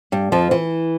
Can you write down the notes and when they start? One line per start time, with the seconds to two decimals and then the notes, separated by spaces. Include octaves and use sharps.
0.12 G2 G3
0.32 F2 F3
0.51 E3